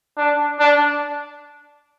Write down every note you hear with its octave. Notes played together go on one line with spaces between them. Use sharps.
D4
D4